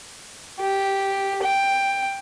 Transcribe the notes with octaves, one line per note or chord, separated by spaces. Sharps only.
G4
G5